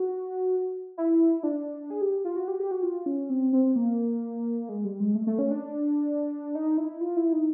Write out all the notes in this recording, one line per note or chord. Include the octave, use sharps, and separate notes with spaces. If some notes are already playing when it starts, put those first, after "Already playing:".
Already playing: F#4
E4
D4
G#4
G4
F4
F#4
G4
G4
F#4
F4
C#4
C4
C4
A#3
G#3
G3
G#3
A3
A3
C#4
D4
D#4
E4
F4
E4
D#4